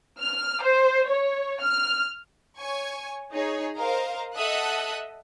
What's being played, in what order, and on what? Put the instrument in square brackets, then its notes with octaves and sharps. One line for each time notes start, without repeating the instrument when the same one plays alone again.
[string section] F6
C5
C#5
F6
C#5 G#5 C#6
D#4 G#4 C#5
A#4 C5 D#5 F5 A#5
A4 D#5 E5 F#5 D#6 F#6